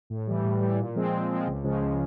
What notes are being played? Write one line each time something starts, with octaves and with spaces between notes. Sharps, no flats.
A2
E3 G3
A2
E3 G3
A#2
F3 G#3 C4
A#2
F3 G#3 C4
C#2
C#3 F3 G#3
C#2